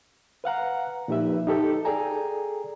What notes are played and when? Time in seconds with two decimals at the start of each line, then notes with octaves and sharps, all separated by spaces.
0.44 B4 F5 F#5 A#5
1.08 A#2 F3 D#4 G4 B4 E5
1.47 D#4 G4 A4
1.85 G#4 A4 D5 G5 G#5 A#5